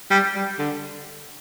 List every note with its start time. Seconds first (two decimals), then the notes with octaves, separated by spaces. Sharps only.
0.11 G3
0.35 G3
0.59 D3